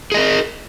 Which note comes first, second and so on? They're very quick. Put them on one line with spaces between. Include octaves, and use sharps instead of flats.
G#4 D#5 A#4